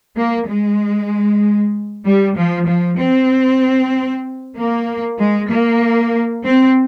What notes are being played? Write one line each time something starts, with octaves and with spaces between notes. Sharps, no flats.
A#3
G#3
G3
F3
F3
C4
A#3
G#3
A#3
C4